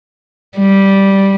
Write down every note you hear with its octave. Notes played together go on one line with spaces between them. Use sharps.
G3